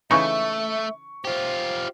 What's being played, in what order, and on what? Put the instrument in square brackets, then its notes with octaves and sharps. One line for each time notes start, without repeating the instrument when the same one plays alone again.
[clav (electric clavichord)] C#3 E3 D#4 [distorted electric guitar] A3 [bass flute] E5 [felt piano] C#6
[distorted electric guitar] F4 G4 [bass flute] C5